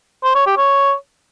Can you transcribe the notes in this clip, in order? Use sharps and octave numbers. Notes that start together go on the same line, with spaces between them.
C5
C#5
G4
C#5